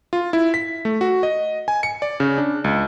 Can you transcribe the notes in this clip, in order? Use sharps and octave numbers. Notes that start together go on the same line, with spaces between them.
F4
E4
B6
A3
F#4
D#5
G#5
C#7
D5
C#3
D4
C#2